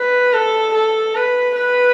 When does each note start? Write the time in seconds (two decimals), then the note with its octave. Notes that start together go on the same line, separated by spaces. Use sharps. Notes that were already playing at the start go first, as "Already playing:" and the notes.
Already playing: B4
0.33 A4
0.74 A4
1.15 B4
1.56 B4